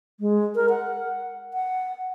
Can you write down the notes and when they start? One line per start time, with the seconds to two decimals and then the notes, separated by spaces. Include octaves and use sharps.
0.20 G#3
0.55 A#4
0.69 F#5
1.54 F#5